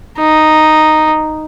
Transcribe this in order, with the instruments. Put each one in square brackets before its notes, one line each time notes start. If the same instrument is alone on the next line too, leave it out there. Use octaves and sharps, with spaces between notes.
[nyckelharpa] D#4